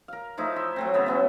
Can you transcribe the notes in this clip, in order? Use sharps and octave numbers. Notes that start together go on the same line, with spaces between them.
A#4 F5
F3 A3 D#4 E4
E5 C6
F#3 A3 C4
C#3 B3 E5 A#5
A3 B3 C#4